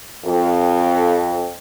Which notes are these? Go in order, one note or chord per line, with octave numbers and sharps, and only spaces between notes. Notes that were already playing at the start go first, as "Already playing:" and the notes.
F2